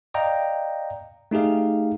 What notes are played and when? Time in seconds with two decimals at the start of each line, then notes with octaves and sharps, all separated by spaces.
0.14 D5 D#5 F5 G5 A#5
1.31 A3 D#4 G4 G#4 F5